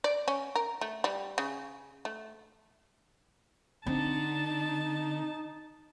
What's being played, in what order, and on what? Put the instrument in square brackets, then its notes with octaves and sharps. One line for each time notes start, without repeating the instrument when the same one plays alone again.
[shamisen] D5
C#4
A#4
A3
G3
C#3
A3
[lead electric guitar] D3 [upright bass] C4 [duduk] D#4 [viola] A5